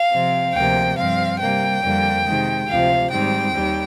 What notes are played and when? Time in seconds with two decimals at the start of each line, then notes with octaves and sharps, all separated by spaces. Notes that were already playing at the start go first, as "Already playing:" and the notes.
Already playing: F5
0.11 C3 F3 C4
0.55 D2 C3 F3 A#3 G5
0.97 G2 F3 C4 F5
1.40 C3 G3 A#3 G5
1.82 F2 D3 G3 A#3
2.25 C3 D#3 G#3
2.68 D2 C3 F3 F5
3.10 G#2 D#3 G3 C4 G5
3.53 D#2 D#3 G3